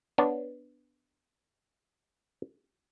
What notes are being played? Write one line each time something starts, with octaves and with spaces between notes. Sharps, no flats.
B3 D4 C#5